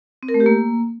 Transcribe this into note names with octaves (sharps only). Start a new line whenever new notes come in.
C4
A#4
A3
G4
A#3